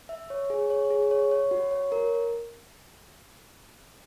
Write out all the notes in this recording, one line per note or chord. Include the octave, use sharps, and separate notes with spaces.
E5
C#5
G#4
C#5
G#4
C#5
C#5
F#4
C#5
A#4